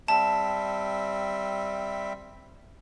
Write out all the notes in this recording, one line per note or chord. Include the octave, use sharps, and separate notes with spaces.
G3 C4 E5 A5